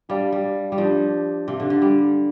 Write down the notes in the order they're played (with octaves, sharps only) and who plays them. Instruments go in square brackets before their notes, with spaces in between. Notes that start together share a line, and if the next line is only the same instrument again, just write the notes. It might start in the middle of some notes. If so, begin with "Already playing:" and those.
[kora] G3 [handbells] D4 G4 D5 F5 A5
[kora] G3
G3
[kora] F3 [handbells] D4 G4 D5
[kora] C3 [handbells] G4 F5 A5
[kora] D3
D3
G3